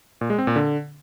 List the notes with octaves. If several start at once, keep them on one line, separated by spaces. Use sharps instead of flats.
A#2
G#3
C4
A#2
D3